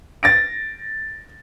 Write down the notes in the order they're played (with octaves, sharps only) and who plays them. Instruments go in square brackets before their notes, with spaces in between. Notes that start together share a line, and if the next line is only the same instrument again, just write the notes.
[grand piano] A6 A#6 D7